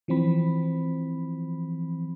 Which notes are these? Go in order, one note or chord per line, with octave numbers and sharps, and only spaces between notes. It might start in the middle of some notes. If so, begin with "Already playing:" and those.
E3 F3 C4 B5